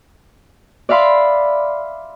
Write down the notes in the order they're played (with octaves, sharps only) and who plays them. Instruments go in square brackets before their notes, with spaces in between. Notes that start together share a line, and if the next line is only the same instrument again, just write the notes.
[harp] D5 E5 F5 B5 C6